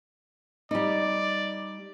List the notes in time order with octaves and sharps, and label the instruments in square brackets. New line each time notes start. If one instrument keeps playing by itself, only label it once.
[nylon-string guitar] G3 D#4 [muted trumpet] D5